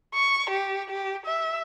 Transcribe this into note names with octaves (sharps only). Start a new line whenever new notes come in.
C#6
G4
G4
E5